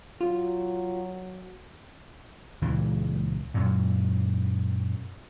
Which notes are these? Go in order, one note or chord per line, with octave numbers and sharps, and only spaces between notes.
F#3 F4
C#2 A#2 E3
F#2 A#2